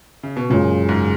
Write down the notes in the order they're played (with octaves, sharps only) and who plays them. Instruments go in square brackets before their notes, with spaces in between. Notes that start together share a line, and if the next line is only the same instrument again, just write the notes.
[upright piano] C#3
B2
[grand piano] F#1 F#2 C#3 G#3 [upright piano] A#2
[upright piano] G#2